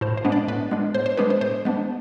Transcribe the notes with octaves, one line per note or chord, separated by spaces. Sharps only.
A2 C5
C5
G#3 B3 D4
D5
A2 B4
G#3 B3 D4
A2 C5
C5
G#3 B3 D4 B4
C5
A2 C5
G#3 B3 D4